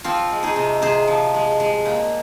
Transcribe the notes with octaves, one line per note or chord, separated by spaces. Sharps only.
F3 C4 F4
G#3
D#4 G#4
C3
C3 G#4 C5
F3
G#3
G#3
A#2